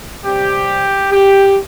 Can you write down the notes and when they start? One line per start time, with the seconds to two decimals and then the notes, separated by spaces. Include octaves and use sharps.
0.23 C3 G3 C4 G4
1.12 G4